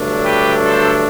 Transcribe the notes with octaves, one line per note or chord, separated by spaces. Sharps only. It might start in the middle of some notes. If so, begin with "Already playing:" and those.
Already playing: G2 D3 F#3 A3 D4
G4 B4
A4 C5